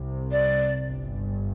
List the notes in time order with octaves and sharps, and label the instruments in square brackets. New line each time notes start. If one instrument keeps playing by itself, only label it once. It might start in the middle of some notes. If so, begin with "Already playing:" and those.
Already playing: [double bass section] C2 C3
[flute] D5
[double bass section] G1 G2